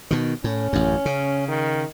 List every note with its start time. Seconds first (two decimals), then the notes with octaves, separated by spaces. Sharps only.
0.11 B2 D#3
0.44 A2 C#4
0.73 A1 F#2
1.06 C#3
1.48 D#3